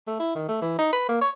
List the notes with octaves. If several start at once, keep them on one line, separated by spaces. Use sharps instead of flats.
A3
E4
D#3
A3
E3
D#4
B4
A#3
C#5